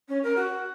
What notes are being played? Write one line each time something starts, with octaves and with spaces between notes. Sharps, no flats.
C#4
A#4
F#4